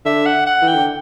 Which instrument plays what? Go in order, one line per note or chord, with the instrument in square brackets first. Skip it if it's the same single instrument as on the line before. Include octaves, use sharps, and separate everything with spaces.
[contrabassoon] D3 [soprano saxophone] E5
[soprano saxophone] F#5
F#5
[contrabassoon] E3
[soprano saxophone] G5
[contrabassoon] D3